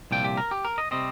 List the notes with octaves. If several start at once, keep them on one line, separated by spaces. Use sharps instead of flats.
C2 A#2 F3 G5
G4
A#4
G4
A#4
D#5
C3 G3 C4 D#5